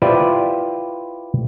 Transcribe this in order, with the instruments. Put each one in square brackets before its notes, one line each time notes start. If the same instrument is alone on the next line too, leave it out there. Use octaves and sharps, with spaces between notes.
[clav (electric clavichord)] E4 F4 G4 B4 C5 D5